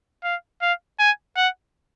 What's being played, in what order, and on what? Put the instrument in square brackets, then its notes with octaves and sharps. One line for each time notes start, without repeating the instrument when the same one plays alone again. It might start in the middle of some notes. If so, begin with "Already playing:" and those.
[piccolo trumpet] F5
F5
G#5
F#5